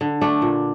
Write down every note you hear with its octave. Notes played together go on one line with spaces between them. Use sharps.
D3
A3 D4
A#2